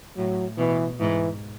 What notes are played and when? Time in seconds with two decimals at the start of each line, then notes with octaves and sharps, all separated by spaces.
0.17 A2 F#3
0.58 B2 E3
1.00 G#2 E3